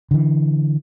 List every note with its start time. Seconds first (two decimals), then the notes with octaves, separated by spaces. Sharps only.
0.11 D3 E3